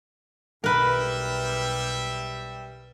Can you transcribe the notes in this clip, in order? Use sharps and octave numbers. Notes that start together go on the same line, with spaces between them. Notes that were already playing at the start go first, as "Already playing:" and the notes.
B1 G3 G4 A#4 B4 E5